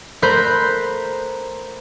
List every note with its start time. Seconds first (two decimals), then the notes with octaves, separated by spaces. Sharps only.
0.22 A3 A#4 C5 B5 F#6 G6